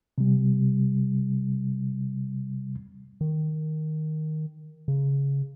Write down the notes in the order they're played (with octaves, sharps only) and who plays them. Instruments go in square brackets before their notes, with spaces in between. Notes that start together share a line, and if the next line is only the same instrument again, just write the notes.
[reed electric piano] C3 G3
[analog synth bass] D#3
C#3